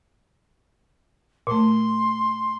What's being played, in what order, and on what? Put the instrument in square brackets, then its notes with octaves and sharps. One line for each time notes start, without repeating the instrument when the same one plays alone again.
[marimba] A#2 A3 [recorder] C6